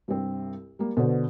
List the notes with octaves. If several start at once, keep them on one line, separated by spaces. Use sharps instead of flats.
C2 G2 C4
G3 A#3
B2 D3 B4 C5